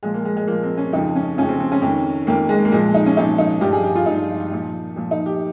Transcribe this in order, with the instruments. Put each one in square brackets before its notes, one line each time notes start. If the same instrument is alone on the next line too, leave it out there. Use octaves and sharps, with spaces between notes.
[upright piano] A#2 F3 G#3
A#3
G#3
G#3
A#2 F3 A#3
C4
C#4
F2 C#3 F3 D#4
C#4
F2 C#3 F3 C#4
C4
C4
C#4
F2 D#3
F2 D#3 A#3
G#3
A#3
A#2 F3 G#3
D#4
C#4
A#2 F3 D#4
D#4
G2 F3 G4
G#4
G4
F4
G2 F3 D#4
A#2 F3
A#2 F3
D#4
G4